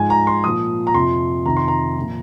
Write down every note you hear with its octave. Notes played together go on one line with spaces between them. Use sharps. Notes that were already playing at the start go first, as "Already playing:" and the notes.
Already playing: G#2 F3 G#5
A#5
C6
A#2 F3 D#6
A#5
F2 C3 F3 C6
F2 C3 D#3 A#5
C6
A#5
A#2 F3